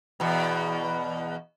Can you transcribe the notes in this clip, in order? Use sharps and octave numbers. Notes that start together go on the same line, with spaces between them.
E2 B2